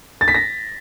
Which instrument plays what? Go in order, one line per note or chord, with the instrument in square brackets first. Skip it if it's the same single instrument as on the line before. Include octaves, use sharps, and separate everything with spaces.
[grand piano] A6
B6
A#6